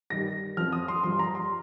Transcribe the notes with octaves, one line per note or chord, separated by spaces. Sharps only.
G2 D#3 G3 A#6
F2 F3 F6
D#6
C6
G2 F3 C6
A#5
C6